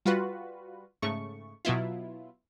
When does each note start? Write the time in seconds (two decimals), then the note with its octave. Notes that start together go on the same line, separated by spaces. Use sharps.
0.06 G3 F4 F#4 B4
1.02 G#2 C#3 A3 C#6
1.65 B2 F#3 B3 E4 F4